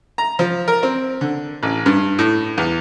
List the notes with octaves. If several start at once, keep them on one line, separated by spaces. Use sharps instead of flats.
A#5
F3
A#4
C4
D3
A1
G2
A2
E2